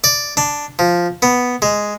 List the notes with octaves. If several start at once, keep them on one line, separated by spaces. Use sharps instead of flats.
D5
D4
F3
B3
G#3